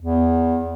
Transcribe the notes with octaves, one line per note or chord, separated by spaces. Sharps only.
E2